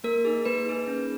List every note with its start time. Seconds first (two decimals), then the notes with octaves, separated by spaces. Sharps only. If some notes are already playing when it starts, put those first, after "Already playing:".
0.04 A#3 A#4
0.25 D#4 G#4
0.45 A#3 B4
0.66 D#4 G#4
0.88 C#4